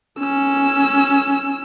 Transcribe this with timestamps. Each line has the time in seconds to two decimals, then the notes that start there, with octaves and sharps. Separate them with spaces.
0.19 C#4 E6